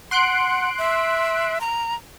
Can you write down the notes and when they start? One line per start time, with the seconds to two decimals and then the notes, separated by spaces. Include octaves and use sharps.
0.11 F#5 C6 F#6 D7
0.78 E5
1.61 A#5